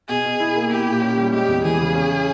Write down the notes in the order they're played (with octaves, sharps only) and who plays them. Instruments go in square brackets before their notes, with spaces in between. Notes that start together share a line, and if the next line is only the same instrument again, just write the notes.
[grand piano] B2 [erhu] G#4
[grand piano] B2
E4
A#3
[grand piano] E4 [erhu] G4
[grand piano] A#2
C#4
G3
[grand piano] G#3 [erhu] G4
[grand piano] E2
[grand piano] E3 [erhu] G#4
[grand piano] C#3
C#4